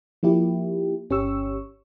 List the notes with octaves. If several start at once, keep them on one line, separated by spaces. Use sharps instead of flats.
F3 A#3 E4 G4
G1 C#4 G4 C#6 E6